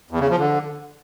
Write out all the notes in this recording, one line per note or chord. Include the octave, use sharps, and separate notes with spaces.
E2
C#3
F3
D3